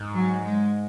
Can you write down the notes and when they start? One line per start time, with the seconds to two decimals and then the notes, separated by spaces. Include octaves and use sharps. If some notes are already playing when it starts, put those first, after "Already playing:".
Already playing: G#2
0.13 F#3
0.43 G#3